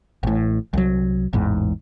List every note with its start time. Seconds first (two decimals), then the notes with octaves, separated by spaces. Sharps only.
0.23 A1 A2
0.73 C2 F#3
1.33 A1 E2 G#2